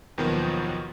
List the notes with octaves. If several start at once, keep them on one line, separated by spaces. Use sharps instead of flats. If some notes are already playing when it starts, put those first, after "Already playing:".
D#2 B2 D#3 F3 F#3 B3